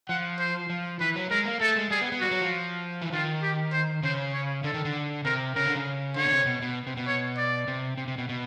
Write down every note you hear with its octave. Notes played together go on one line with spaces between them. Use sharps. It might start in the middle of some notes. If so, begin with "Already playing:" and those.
F3 F#5
C5
F3
E3 B4
F#3
G#3 A#4
A#3
A3 A4
G#3
G3 G#4
B3
B3
G3 F#4
F#3
F3
E3
D#3 F4
G4
C5
C#3 C5
C#5
D3 A4
D#3
D3
C3 A#4
C#3 A#4
D3
C#3
D3 C#5
B2
C3
B2
B2
C3
B2
C#5
D5
C3
C3
C3
B2
B2